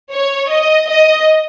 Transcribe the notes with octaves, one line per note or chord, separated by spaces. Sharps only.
C#5
D#5
D#5